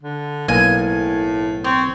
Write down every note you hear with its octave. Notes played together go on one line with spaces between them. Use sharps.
D3
B1 A2 A#3 G#5
C4 C#5